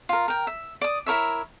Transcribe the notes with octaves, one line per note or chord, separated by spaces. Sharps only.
F4 A#4
A#4 G5
E5
D5 D#6
E4 A#4 C#5 E5